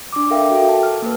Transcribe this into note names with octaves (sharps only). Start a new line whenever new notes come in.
D4 D6
A4 A#4 E5 F5 G5
F#4 A4
A5
F6
A#3 B4